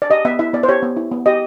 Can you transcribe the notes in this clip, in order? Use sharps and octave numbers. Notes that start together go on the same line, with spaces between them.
D5
G4 D#5
B3 E5
E4 E5
B3 D5
C5
G4 C#5
B3
E4
B3
G4 D#5